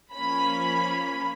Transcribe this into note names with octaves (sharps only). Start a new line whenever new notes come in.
F3 A#3 C#4 B5